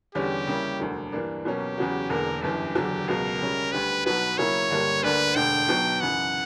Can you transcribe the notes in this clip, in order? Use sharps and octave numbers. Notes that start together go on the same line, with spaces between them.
E2 D3 G3 C#4 G4
C#3 G3 A#3 C#4 E4
E1 D2 D3 F#3 A#3
G2 E3 A#3 D4
B2 F#3 A#3 C#4 G4
E2 C#3 F#3 C#4 F#4
E1 E2 D3 A#3 A#4
G1 F#2 E3 G4
F#1 E2 D3 F#3
C#2 B2 F#3 A#4
C#2 C#3 G3 C#4
D2 D3 G3 B4
B1 B2 F#3 B3 F#4 B4
C#3 F#3 A#3 C#4 E4 C#5
G1 G2 D3 G3 A#3
D2 D3 A#3 D4 B4
E1 D2 D3 G5
B1 B2 F#3
F#2 C#3 E3 F#5